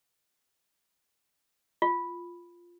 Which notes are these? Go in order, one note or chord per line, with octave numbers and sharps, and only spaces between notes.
F4